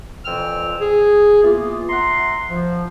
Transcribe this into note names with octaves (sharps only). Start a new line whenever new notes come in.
F2 A#2 E3 G5 E6 F6
G#4
E3 A#3 B3 F4
E5 F#5 A#5 C6
F3